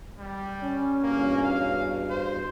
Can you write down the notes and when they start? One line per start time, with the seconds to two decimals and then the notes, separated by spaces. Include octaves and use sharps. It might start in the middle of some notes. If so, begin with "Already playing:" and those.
0.19 G3
0.63 C#4
1.03 E2 G2 B2 A#3
1.43 F5
2.10 C5